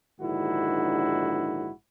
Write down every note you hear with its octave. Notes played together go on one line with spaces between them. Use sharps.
A#1 G#2 D3 D#3 E4 F#4